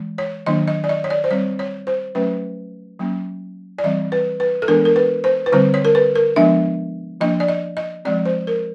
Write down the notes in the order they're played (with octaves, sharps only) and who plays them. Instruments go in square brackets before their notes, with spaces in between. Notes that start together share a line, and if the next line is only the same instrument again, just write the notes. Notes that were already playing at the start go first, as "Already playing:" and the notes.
Already playing: [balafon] E3 G#3
C#5
D#3 F#3 A#3 D4 D#5
D#5
D5
D#5
C#5
D5
C5
G3 C4 C#5
C#5
C5
F#3 A3 C#4 B4
F#3 A#3 C#4
D5
E3 G3 C4 D#5
B4
B4
A4
E3 G#3 B3 D4 A#4
A#4
B4
C5
B4
D3 G3 C4 C5
C#5
A#4
B4
A#4
F3 G#3 B3 D4 E5
F3 A#3 D4 D#5
D5
D#5
D#5
F3 G#3 C4 D5
C5
A#4